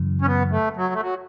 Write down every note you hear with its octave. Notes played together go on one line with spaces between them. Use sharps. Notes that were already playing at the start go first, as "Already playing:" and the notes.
Already playing: F#2 C#3 E3
C#4
B3
A3
F#3
A3
F#3